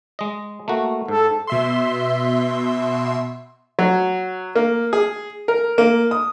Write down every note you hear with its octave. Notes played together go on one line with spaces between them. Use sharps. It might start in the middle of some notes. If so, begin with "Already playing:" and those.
G#3 D#5
A3 A#3 F#4
G#2 A4
B2 E5 C6
F#3
A#3
G#4
A#4
A#3
D#6